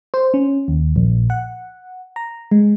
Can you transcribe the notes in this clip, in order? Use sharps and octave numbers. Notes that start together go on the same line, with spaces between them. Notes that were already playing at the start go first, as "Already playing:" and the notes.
C5
C#4
D#2
A#1
F#5
A#5
G#3